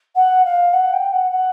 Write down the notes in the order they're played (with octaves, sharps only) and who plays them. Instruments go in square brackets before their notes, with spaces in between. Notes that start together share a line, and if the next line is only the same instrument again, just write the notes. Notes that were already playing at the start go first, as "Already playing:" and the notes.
[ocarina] F#5
F5
F#5
G5
F#5
F#5